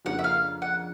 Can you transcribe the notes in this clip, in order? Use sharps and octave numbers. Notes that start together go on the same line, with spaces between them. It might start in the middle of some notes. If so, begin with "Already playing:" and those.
F2 C#3 F3 A#3 D4 F#5
E5
F5
F#5